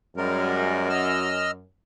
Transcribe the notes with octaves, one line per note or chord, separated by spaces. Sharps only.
F#2 G3 G#3 A#4
D#5 E6 F6